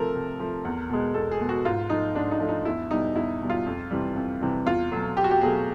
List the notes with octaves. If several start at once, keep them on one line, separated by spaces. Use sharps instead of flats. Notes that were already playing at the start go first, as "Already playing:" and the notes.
Already playing: C3 F3 A3 A4 A#4
C3
F3 A3
E2
B2 G#3
E2 A4
G#4
B2 G#3
F#4
G#2 F4
F3 A3 D#4
G#2 D4
D#4
F3 A3
D#4
E2 E4
B2 G3 D#4
E2 E4
B2 G3
F4
F2
C3 E3 G3
F2
C3 E3 G3
E2 F4
B2 F#3 A3
E2 G4
F#4
G4
B2 F#3 A3 G#4